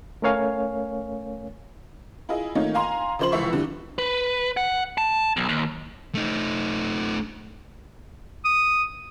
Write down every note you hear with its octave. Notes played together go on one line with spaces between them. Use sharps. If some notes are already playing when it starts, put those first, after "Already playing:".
A3 C#4 A#4 C#5 F5 G#5
E4 F4 G#4 D#5
D#3 A3 A#3 D#4 F4 C#5
F5 G#5 A#5 C6
C#3 F3 C5 C6 F#7
F1 C#2 E3 E5 C#6
E2 D3 G3
B4
F#5
A5
B1
D#2
A3 D#4
D#6